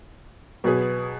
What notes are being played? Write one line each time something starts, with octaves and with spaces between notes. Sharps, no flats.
B2 F#3 B3 G#4